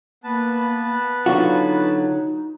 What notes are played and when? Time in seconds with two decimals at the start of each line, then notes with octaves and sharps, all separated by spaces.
0.24 A#3 B3 B4 A5
1.26 D3 F#3 D#4 F4 F#4